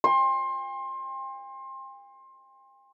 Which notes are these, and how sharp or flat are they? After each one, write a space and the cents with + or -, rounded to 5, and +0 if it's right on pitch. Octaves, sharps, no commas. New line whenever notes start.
G5 +45 C6 +25